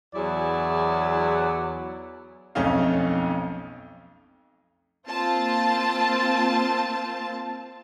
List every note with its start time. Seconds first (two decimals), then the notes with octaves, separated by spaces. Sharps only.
0.14 E2 F#3 E4 G#4 D5
2.55 B1 F2 A3 C#4 D#4 F5
5.08 A#3 C4 F4 A5